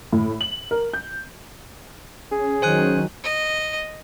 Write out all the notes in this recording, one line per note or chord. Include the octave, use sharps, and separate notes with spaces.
A2
F#7
A#4
G6
C#4 G#4
D#3 F#3 C5 G#5 F#6
D#5